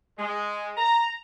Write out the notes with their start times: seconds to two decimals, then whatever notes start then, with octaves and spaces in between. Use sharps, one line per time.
0.18 G#3
0.77 A#5